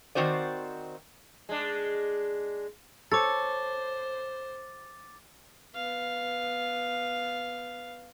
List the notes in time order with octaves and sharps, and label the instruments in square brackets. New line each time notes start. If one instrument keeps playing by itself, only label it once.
[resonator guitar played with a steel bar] D#3 C4 F#4 C5 D5
[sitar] G#3 D4
[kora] A4 C#5 [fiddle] C5 [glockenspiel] D6 A6
[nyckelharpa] B3 F5